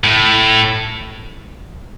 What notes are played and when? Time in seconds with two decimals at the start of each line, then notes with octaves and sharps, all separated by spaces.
0.04 A2